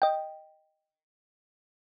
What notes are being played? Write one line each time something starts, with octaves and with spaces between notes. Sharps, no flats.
D#5 G5